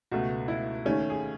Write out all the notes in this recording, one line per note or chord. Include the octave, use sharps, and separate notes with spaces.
C#2 B2 A3 F#4
E4
D#2 D#3 A3 C#4
G#4